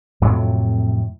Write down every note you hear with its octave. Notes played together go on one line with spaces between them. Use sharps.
F2 A2 C3 F#3